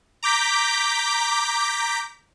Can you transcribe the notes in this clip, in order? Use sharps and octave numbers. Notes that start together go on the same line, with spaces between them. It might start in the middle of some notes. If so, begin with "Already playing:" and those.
A#5 D6 G6 B6